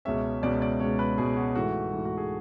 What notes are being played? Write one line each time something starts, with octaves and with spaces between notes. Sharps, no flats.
C#2 B2 G#3 C#4 E5
C#2 B2 G#3 C#4 D5
D5
C#2 B2 G#3 C#4 C#5
B4
C#2 B2 G#3 C#4 G#4
F#4
G#2 E3 A3 F#4
G#2 E3 A3
F#4
G#4